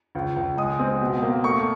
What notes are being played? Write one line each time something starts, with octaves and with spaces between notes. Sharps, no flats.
C#2
C#2
G#3 D#6
C4
B2
A#3
A3 C#6